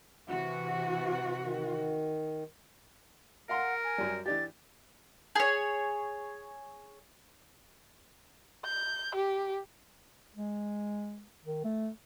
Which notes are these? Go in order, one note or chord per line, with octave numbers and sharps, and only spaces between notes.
C3 E3 F#4
D#3
A#4 F5 F#5 A#5 C6
G#5
F#2 G3
E3 D4 G4 A6
G#4 C#5
G6
G4
G#3
D#3
A3